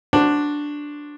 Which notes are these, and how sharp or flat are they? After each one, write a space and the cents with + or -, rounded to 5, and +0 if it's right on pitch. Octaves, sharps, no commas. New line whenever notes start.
D4 +0 F#4 +0 C5 +10